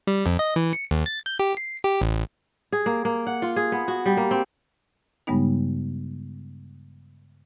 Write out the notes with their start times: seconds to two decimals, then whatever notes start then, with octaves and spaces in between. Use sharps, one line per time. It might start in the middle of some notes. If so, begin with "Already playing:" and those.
0.07 G3
0.26 F2
0.39 D#5
0.56 E3
0.73 C#7
0.91 D#2
1.06 A6
1.26 G6
1.39 G4
1.57 C7
1.84 G4
2.01 A1
2.72 G#4
2.86 A#3
3.05 A#3
3.27 F#5
3.42 F4
3.56 G#4
3.72 B3
3.88 F#4
4.06 G3
4.17 A#3
4.31 C4
5.27 G2 C#3 G3 G#3 B3 D#4